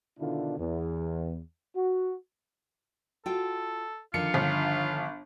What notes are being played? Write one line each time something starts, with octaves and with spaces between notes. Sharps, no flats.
B2 D3 D#3 D4 E4 F4
E2
F#4
F4 F#4 A4 G5
D3 D#3 F3 F4 C#7
G1